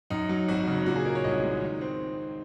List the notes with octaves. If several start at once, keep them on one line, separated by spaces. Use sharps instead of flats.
F#2 D#4
F#3
G#1 F#4
C#3
A#2 F#4
G#4
D#4 A#4
C#5
C2 D#5
G#3
D#3
C4